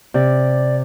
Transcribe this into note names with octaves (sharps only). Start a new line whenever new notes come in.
C3 D5